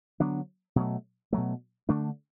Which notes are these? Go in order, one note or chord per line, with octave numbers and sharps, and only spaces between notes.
D3 F#3 B3 D4
B2 F#3 A3
B2 F#3 A3
D3 A3 D4